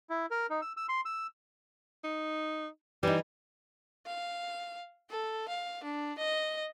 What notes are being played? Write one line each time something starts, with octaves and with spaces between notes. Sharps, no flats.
E4
A#4
D#4
E6
E6
C6
E6
D#4
E3 G3 D#4
F5
A4
F5
D4
D#5